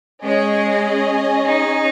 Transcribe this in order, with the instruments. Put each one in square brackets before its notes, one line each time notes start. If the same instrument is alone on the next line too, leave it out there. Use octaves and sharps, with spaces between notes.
[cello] G#3 [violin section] C#4 G#4 D#5
[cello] D#4